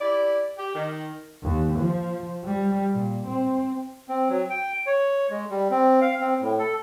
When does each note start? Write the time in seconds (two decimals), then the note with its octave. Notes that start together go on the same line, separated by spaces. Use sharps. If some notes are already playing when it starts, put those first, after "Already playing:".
0.01 E4 G4 D5
0.58 G4
0.75 D#3
1.44 D#2
1.80 F3
2.45 G3
2.93 A#2
3.27 C4
4.09 C4
4.29 F#3
4.50 G5
4.86 C#5
5.30 G#3
5.50 G3
5.71 C4
6.01 F5
6.20 C4
6.41 A2
6.59 A4